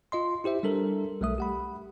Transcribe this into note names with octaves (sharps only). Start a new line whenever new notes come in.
F4 D#5 C6
E4 G4 C5 E5
G3 D4 A4 A#4
B1 G3 A3 E5 D#6
G4 F#5 B5